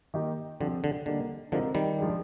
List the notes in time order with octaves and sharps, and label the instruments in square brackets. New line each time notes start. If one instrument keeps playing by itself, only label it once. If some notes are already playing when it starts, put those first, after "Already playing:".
[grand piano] D#3 A#3 D#4 G4
[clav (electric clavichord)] D3 [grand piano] F3 C4 G4
[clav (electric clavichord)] D3
[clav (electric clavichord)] D3 [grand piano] G3 A#3 D#4 G4
[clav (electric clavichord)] D3 F3 [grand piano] G#3 C4 D#4 G4 A#4
[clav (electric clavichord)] D#3 G3
[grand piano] F3 G#3 D4 G#4